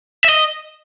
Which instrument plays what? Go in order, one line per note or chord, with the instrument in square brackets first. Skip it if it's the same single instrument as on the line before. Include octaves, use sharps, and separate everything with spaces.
[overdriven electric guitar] E5
D#5